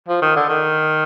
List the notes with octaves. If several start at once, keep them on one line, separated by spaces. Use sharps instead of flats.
F3
D#3
D3
D#3